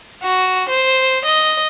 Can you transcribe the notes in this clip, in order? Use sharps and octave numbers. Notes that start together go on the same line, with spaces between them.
F#4
C5
D#5